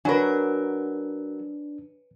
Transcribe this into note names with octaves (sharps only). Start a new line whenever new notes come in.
F#3 D4 A#4 B4 C#5 G#5